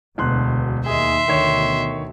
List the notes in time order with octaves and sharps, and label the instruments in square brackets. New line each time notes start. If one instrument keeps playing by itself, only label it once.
[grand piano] E1 C6 F#6 [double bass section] D2 B2
[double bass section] D#2 [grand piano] G#4 D#5 [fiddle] E5 C6
[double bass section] D2 B2 [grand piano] D#3 C#5 E7